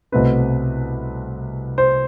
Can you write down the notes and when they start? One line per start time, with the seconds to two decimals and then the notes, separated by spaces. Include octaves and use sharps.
0.12 C2 B2 A3 C4 B4
1.78 C5